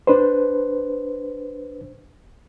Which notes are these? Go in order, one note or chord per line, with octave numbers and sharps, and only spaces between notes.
D4 B4 C5